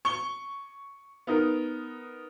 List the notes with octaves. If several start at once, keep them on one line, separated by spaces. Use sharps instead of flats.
C#6 G7
B3 D#4 A#4